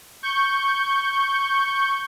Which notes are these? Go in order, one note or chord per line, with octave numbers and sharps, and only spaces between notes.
C#6 G6